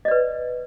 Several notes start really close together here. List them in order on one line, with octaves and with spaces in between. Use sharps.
D#5 D5 B4